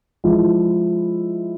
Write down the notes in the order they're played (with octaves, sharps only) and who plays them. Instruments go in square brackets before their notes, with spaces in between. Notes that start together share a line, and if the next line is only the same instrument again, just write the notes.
[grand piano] F3 G#3 E4